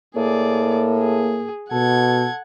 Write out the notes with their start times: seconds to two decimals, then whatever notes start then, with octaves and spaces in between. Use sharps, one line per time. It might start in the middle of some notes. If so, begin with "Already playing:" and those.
0.16 A2 A#3 G#4 D5
0.98 G#4
1.72 B2 A4 F#5 G#6